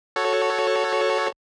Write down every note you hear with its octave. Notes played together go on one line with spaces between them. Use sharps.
F#4 A4 C#5